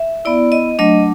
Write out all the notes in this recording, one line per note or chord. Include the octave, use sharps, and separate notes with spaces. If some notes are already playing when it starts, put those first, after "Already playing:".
Already playing: E5
B3 E4 D5
D#5
F#3 A3 D4 D#5